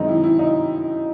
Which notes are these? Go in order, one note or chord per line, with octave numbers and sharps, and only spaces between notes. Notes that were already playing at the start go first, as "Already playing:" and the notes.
Already playing: F#2 D#3 G#3 C4 D#4
E4
E4
D#4